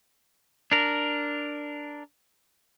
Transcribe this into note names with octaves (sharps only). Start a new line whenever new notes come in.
D4 A#4